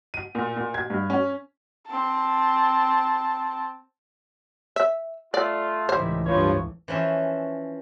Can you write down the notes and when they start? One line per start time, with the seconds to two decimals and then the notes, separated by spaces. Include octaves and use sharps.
0.14 D#7
0.35 A#2
0.57 A#2
0.74 G#6
0.90 G2
1.10 C#4
1.87 C4 A5
4.76 E5
5.34 A3 F4 D5
5.89 C#2 A2 D#3 E3 G3 E4 C5
6.26 G2 F3 F4 B4 C#5
6.88 E3 F3 C#4 E5